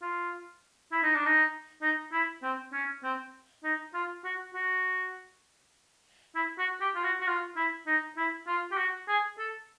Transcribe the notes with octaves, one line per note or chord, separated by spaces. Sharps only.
F4
E4
D#4
D4
D#4
D#4
E4
C4
C#4
C4
D#4
F4
F#4
F#4
E4
F#4
G4
F4
F#4
F#4
F4
E4
D#4
E4
F4
G4
F#4
G#4
A4